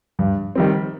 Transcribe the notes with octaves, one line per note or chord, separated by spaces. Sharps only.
G2
D#3 G3 C4